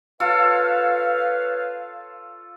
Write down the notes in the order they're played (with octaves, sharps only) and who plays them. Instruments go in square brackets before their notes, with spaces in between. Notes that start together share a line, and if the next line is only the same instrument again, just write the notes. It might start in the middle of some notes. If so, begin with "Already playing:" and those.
[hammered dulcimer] F4 A4 [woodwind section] B4 C#5 F5